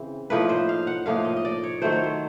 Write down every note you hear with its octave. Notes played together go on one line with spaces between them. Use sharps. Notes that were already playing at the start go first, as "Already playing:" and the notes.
Already playing: C#3 E3 C4
A2 F3 A#3 D#4 B4
C5
F5
F#5
A2 F3 A#3 D#4 F5
D#5
D#5
D5
C#5
D#3 F#3 A3 C5
C#5
C5